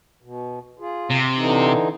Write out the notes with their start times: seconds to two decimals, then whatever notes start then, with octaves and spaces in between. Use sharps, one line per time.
0.22 B2
0.79 F4 G#4
1.10 C3
1.36 D3 E3 D#4